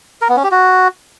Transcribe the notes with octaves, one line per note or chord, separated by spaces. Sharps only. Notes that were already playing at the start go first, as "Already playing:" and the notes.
A#4
B3
C#4
G4
F#4